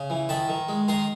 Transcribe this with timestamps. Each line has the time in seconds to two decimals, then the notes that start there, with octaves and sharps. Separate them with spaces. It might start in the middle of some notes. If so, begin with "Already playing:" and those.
Already playing: C#3
0.10 E3
0.29 D#3 A5 B5
0.49 D#3
0.69 G#3
0.88 D#3 A#5 C6